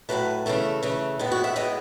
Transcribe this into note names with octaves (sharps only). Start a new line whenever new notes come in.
A2 F#3 A3 B4
C#3 E3 A3 A4
C#3 E3 A3
A2 G#3 B3
F#4
E5
A2 G#3 B3 D#5